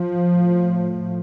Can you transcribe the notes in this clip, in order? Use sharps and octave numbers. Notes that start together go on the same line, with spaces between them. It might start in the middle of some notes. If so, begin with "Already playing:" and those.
Already playing: F3
A2